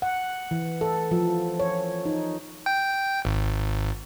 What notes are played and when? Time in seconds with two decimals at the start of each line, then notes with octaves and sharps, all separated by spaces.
0.02 F#5
0.51 E3
0.81 A4
1.11 F3
1.60 C#5
2.06 D#4
2.66 G5
3.25 G#1